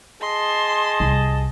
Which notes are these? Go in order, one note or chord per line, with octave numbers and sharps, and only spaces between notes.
G#4 D#5 A5 C6
C2